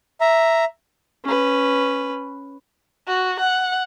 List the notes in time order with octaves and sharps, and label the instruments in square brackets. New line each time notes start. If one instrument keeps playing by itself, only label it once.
[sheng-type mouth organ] E5 A#5
[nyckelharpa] C#4 B4
[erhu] F#4
F#5